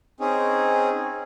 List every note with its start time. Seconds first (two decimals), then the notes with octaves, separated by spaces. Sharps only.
0.20 C4 C#4 D#4 G#4